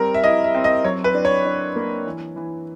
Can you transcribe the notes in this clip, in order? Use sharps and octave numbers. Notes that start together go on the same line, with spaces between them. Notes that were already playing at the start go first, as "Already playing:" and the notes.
Already playing: G3 C4 A#4
E5
E4 D#5
E5
C4
D#5
F#3 C#5
B4
D4
C#5
D4
A#3
E3
E3